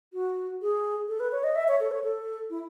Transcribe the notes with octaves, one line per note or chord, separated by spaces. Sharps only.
F#4
G#4
A4
B4
C#5
D#5
E5
C#5
A4
C#5
A4
E4